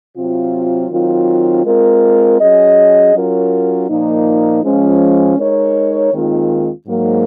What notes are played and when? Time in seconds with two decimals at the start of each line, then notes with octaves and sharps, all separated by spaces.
0.16 C3 F#3 C4 F4
0.91 D#3 F#3 C4 F4
1.65 G#3 C4 F4 A#4
2.40 F#3 C#4 G#4 D#5
3.14 F#3 C#4 F4 A#4
3.89 A#2 F3 A#3 D#4
4.63 F3 G#3 C#4
5.38 G#3 D#4 A#4 C#5
6.13 D#2 D#3 G#3 C4 F4
6.86 G#2 F#3 A#3